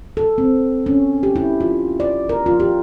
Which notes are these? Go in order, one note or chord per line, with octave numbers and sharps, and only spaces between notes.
A4
C4
C#4
G4
E4
F4
D5
A#4
F4
G4